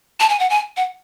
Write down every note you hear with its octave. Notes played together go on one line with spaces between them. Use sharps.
A5
G#5
F#5
G#5
F#5